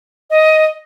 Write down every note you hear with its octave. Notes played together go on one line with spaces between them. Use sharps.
D#5